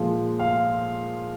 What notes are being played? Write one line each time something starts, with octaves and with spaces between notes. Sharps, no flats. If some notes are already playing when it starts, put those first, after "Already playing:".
Already playing: A#2 F3 G#3
F5